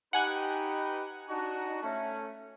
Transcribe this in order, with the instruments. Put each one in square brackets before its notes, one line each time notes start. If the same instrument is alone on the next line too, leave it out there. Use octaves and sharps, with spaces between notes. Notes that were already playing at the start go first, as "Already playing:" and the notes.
[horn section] D#4 G4 B4 [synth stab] F#5 G#5 F#6
[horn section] D4 D#4 F#4
A3 C#4